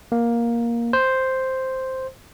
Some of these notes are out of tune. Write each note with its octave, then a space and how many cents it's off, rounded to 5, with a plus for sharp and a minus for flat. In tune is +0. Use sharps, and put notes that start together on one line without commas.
A#3 +10
C5 +0